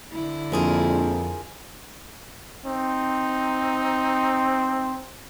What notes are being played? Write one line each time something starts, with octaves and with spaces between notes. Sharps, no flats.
D3 E4
A#1 F2 F4 G#4 A#4
C4 D#4